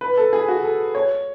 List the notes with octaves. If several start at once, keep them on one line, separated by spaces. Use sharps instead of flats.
B4
A4
G#4
F#4
A4
C#5